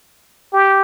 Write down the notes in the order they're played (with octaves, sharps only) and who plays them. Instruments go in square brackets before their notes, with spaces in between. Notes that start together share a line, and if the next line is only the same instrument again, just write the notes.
[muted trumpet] G4